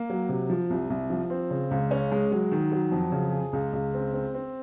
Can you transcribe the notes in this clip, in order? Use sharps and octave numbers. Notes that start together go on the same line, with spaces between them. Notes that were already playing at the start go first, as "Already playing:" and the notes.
Already playing: A#3
F#3
C3
F3
C2
C2
F3
C4
C#3
C#2
C#4
G#3
F#3
D#3
F#3
F2
C#3
G#4
C#2
C#2
C4
C4
C4